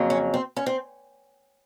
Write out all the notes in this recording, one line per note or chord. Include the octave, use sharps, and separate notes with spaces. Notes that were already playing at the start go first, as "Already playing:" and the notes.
Already playing: F2 C#3 F#3 A#3
C#4
C4
C#4
C4